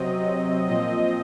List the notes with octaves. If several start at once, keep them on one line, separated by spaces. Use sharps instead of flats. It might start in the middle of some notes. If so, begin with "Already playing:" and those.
Already playing: C3 F#3 C4 D#5
A#2 F3 C4 D#5